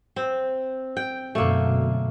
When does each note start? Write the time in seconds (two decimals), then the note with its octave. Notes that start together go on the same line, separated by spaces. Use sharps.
0.16 C4
0.97 G5
1.35 F#2 B2 D3 A3 A#3